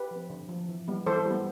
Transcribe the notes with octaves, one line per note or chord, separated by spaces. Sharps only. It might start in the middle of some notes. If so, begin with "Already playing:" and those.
Already playing: G4 B4
F3 C4
D3
F3 C4
E3
G3 B3
E3 A4 C5
G3 B3